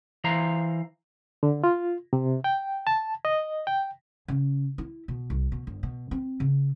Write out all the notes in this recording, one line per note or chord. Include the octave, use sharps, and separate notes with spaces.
E3 C5 F5 A#5
D3
F4
C3
G5
A5
D#5
G5
C#3
E4
B2
C2
B2
G1
B2
C4
C#3